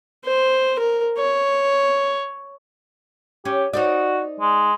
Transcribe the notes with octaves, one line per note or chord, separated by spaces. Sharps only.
C5
A#4
C#5
C#4 G4
D#4 F#4 C5 D5
G#3